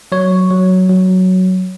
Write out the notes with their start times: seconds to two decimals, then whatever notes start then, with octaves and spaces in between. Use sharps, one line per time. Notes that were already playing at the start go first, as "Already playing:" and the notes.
0.12 F#3 C#5
0.51 F#3
0.89 F#3